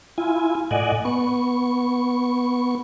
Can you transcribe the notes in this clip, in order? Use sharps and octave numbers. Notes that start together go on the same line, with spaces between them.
E4 F4 G#5
A2 D5 D#5 F#5 G#5
B3 C#6